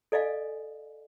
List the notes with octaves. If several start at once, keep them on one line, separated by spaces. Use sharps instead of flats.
A4 D5 D#5 F5 G#5